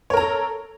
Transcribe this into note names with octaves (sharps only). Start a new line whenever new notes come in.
A4 A#4 C#5 A#5